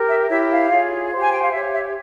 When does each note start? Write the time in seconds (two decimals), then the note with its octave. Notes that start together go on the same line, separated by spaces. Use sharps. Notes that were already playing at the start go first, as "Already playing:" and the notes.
Already playing: G4 A#4
0.09 E5
0.29 E4 G4 C#5 E5
0.50 F5
0.70 F4 G#4 C#5
1.11 G4 C5
1.21 G#5
1.31 G5
1.42 F5
1.52 G4 C#5 E5
1.72 E5